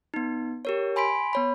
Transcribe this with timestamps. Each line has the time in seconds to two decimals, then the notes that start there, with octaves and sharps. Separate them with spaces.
0.14 B3 D#4
0.65 G4 A#4 C#5
0.96 G#5 B5 C6 B6 D7
1.33 B3 C#5 B5